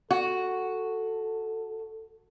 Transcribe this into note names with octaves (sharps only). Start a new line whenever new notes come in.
F#4 A4